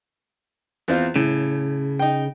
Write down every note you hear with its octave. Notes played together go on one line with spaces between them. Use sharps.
E2 C4 F4
A2 C#3
D#4 G5